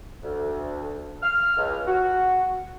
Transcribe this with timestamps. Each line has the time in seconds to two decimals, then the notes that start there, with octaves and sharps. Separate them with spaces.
0.23 D2
1.22 F6
1.57 C#2
1.87 F#4